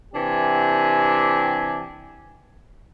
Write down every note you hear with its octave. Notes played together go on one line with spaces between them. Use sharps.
C3 E3 D4 G4 G#5